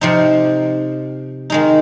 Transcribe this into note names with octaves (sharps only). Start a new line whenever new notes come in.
C3 F3 C4 D#4
D#3 G#3 D#4